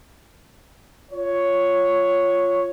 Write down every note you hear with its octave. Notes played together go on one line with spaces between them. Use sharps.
F4 C#5